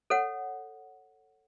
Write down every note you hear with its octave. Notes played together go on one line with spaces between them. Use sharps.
A4 C#5 F#5